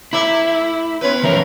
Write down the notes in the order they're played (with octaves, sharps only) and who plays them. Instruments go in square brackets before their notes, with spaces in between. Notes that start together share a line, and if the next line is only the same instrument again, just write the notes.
[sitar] A3 D5 E5 [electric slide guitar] E4
[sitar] B3 C#4 B4
[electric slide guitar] E3 F3 C#4 [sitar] A#4